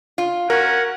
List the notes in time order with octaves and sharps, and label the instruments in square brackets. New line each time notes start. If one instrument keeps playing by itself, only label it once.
[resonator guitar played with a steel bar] F4
[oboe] C#4 [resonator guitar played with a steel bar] F#4 [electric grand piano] A#4 [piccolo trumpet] F#5